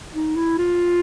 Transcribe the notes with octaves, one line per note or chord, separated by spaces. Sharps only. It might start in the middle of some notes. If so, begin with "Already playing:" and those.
D#4
E4
F4